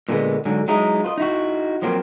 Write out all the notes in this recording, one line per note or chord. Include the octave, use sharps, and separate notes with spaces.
A#2 D3 G#3 B3
G#2 D3 F#3
F#3 G#3 D#4 E4
F4 B4 D#5
D#4 E4 F#4
F3 F#3 A#3 C4